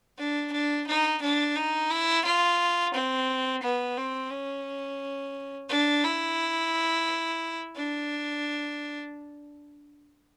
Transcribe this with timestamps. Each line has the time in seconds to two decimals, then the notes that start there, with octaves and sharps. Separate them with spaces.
0.18 D4
0.52 D4
0.87 D#4
1.22 D4
1.56 D#4
1.90 E4
2.25 F4
2.93 C4
3.63 B3
3.97 C4
4.31 C#4
5.69 D4
6.04 E4
7.76 D4